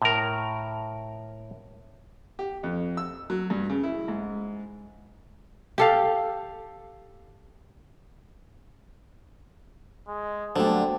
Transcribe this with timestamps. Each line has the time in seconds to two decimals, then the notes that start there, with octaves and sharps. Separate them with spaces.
0.02 A2 A#4
2.39 G4
2.63 F2
2.97 E6
3.30 F#3
3.50 G2
3.70 C#3
3.83 E4
4.08 G#2
5.78 G4 A4 F5
10.08 G#3
10.56 D3 F#3 G3 A3 D4 C5 G5